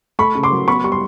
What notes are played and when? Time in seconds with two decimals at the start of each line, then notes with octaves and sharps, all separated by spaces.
0.19 A3 B5 C#6
0.35 C#3
0.43 C6 D6
0.51 F#3
0.67 B3 B5 C#6
0.84 G3 C#6
0.92 C6